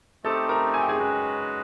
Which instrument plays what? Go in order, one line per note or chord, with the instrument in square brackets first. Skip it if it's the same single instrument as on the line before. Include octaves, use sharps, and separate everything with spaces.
[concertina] A3 C4 D#4 G4 [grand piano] A4 A5
[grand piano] A#4 A#5
G#5
G5
G#4 G#5
[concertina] G#3 C#4 F#4 B4